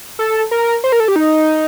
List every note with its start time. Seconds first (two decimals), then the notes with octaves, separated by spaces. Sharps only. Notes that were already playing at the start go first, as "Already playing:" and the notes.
0.19 A4
0.51 A#4
0.84 C5
0.92 A#4
1.00 A4
1.08 G4
1.16 D#4